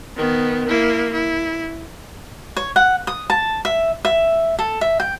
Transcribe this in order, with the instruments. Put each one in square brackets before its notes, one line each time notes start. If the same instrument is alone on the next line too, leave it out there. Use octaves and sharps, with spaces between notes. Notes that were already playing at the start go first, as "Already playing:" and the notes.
[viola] D#3 B3
A#3 E4
E4
[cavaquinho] C#5
F#5
D#6
A5
E5
E5
A4
E5
G5